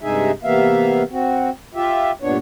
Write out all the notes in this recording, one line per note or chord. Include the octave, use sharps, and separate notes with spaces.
G2 C3 G#3 D#4 G#4 E5
C3 E3 A#3 B3 E5 F5
C4 F#4
F4 G4 E5
G2 A#2 B3 D4 C#5